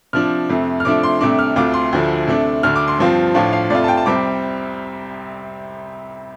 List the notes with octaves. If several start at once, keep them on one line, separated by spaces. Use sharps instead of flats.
C3 F3 D4 F6
F2 C3 A3
F6
C3 F3 A3 D4 D6
C6
C2 C3 A3 D4 D6
F6
D2 C3 A3 F4 D6
C6
D2 D3 F3 A3
C3 A3 D4
D2 D3 A3 F6
D6
C6
G2 F3 C4 F4
A2 F3 D4 F4 A5
F5
F2 C3 A3 F4 D5
A5
G5
A5
C2 C3 G3 C4 D6